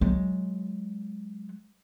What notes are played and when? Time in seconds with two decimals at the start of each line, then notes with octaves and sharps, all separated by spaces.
0.01 F#3 G#3